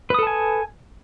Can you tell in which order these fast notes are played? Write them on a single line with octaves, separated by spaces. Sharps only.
B4 D#6 A4 A5 G#5